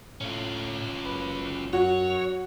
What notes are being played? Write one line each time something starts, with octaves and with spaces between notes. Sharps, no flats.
A2 C#4 F4
F#1 B4
F#2 F#3 F#4 C#5